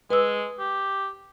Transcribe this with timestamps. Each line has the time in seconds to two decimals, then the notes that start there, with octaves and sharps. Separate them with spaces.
0.10 G#3 B4 E6
0.60 G4